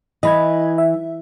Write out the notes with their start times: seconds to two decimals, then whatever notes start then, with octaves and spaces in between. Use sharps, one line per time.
0.23 E3 D#5 B5 G#6
0.78 E5